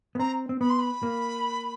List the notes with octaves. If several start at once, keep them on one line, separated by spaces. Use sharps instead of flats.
B3
C4 A#5
C4
B3 B5
C6
B5
A#3